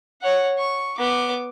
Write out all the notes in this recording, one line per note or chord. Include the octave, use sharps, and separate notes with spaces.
C#5 F#5
C#6
B3 D6